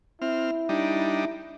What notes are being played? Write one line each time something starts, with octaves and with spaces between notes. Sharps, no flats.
C4 E4 F6
G3 D4 D#4